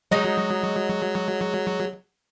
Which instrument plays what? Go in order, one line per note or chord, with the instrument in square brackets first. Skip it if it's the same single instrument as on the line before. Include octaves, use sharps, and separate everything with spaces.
[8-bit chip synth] F#3 [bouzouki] G#3 D#4 D#5